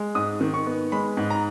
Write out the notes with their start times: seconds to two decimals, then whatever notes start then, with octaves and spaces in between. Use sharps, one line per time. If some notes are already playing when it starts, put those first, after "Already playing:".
Already playing: G#3
0.15 G#2 D#6
0.41 D#3
0.54 C#6
0.67 B3
0.92 G#3 B5
1.17 G#2
1.30 A#5